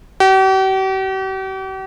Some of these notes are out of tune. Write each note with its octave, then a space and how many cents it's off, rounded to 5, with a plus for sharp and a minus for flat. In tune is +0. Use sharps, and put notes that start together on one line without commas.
G4 -45